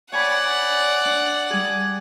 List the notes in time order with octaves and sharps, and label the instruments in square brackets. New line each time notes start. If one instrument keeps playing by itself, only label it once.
[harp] C#5 G#5 B5 [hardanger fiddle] D5 F#5
[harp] D4
G3 G#4